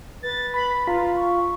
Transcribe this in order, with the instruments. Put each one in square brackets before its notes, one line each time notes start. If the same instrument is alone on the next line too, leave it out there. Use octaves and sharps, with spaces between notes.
[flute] B4 [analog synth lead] A6
[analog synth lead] B5
[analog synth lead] F4 [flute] A#5
[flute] C#6